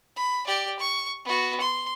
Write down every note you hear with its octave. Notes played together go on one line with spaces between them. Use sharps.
B5
G4 D5
C#6
B3 F#4
C6